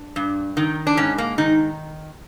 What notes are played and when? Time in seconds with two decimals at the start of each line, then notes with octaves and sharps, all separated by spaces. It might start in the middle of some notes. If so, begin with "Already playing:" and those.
Already playing: D4
0.16 G2
0.57 D#3
0.87 D4
0.97 G#2 C#4
1.18 A#3
1.38 D#3 D#4